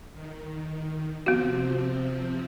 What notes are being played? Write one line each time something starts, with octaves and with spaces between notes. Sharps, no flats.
D#3
C3 F3 B3 C4 F#4